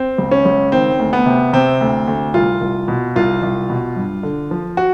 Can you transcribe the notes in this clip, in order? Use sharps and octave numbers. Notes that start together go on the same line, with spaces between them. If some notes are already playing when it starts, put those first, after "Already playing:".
Already playing: C4
C#2
C#4
C#2
D#3 C4
D2
B3
C3
C3 C4
D2
D2
C2 F4
C2
B2
C2 F4
C2
B2
G2
D3
F3
F#4